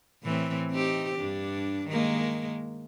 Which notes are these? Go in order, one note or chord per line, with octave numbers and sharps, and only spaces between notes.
A2 E3 C4
C4 D#4 G4
G2 D4
D#3 G#3 A#3